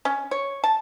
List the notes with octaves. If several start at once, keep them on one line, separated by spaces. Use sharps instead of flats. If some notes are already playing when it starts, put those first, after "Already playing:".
C#4
C#5
A5